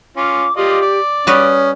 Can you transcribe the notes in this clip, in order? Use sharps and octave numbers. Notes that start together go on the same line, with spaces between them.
C#4 F4 D6
F4 G4 D5 D#5
D5
G3 C#4 F#4 B4 D#6